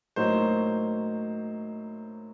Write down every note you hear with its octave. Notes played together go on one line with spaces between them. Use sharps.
A2 F#3 A#3 D#4 C5